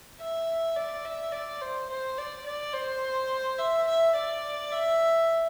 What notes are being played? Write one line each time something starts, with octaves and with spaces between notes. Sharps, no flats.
E5
D5
E5
D5
C5
C5
D5
D5
C5
E5
E5
D5
E5